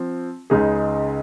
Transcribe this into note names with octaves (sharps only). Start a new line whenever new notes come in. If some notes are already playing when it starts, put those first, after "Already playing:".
Already playing: F3 C4
C#2 C#3 G#3 D#4 G#4